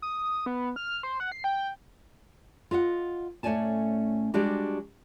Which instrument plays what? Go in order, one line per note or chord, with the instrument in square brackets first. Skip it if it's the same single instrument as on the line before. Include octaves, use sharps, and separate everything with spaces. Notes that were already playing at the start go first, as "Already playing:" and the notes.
[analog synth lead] D#6
B3
F6
C5
F#5
C7
G5
[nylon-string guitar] F4 D#5 E5 F#5
A2 A3 C#4 D5 G#5 A5
G3 G#3 D4 F#4 G4